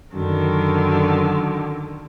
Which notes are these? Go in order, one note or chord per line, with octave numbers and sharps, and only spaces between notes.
F#2 D3 D#3